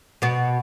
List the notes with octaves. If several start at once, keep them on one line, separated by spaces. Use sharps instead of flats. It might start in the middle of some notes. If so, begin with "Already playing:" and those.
B2 B3